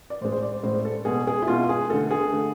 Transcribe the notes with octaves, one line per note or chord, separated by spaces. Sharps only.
D5
A2 G#3 C5
C5
D5
C5
A2 G#3 C5
A4
B2 G#3 G#4
G#4
E4
B2 G#3 F4
G#4
D3 A3 A4
G#4
D3 A3